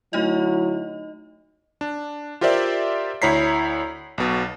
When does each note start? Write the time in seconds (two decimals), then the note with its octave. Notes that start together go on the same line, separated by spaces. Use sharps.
0.13 D3 F#3 A3 D#4 E4 D#5
1.81 D4
2.41 F4 G4 A#4 C5 D5 E5
3.22 D2 E4 C#5 A#5 B6 C7
4.18 B1 B2